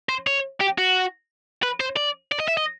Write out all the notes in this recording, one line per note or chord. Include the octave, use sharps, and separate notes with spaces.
C5
C#5
G4
F#4
B4
C5
D5
D5
D#5
E5
D#5